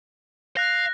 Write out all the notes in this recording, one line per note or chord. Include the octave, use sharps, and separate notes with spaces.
F5 F#6 A#6